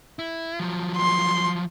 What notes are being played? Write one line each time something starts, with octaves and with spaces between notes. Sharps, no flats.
E4
F3 F#3
C6